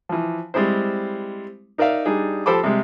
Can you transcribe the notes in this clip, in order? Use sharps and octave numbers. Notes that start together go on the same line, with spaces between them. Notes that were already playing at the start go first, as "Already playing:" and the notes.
E3 F3
G3 G#3 C4 E4 C5
D#4 A#4 D5 E5 F5
G3 D4 D#4 G#4
F3 G4 A4 C5 B5 D6
C3 G3 G#3